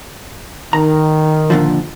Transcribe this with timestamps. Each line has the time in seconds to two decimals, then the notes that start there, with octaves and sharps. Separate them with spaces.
0.73 D#3 A#5
1.50 A#2 D3 F3